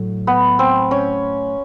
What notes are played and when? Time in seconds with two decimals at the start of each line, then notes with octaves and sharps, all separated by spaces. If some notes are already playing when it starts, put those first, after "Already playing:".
Already playing: A2 F#3 A3
0.27 B3
0.59 C4
0.91 C#4